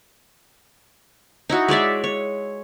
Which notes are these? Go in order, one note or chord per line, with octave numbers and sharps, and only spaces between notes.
D#4 E4 F#4
G#3 C#5 D5 E5
C#5